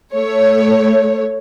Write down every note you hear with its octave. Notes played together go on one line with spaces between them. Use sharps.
A3 C#5